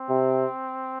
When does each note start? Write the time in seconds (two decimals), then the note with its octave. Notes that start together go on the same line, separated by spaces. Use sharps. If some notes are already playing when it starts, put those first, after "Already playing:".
Already playing: C4
0.09 C3